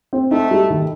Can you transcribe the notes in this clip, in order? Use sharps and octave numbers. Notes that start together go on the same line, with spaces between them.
C4
A3 D#4
G3
D#3